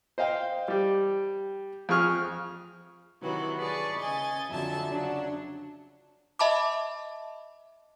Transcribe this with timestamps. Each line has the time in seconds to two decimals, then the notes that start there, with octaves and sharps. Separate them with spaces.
0.18 C5 D#5 F5 G5
0.68 G3 G4
1.89 F2 G#4 C#6 F6
3.22 C3 D#3 E3 F#3 F#4
3.58 G#4 B4 D5 A5 C#6
3.99 C#3 D#5 G#5 A6
4.49 F2 D3 F#3 E5 A5
4.88 C#3 F#3 D4
6.39 D#5 E5 A5 B5 D6